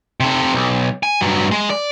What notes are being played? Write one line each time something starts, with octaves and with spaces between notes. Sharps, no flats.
C3 A4
B1
G#5
G2 F#3
G#3
D5